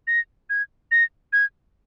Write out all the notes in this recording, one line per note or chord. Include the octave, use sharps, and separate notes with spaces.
A#6
G#6
A#6
G#6